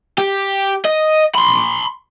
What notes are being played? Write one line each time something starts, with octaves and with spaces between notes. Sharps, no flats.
G4
D#5
B5 C6